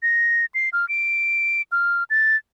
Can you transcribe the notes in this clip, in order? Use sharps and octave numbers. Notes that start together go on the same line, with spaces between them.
A#6
C7
F6
D7
F6
A6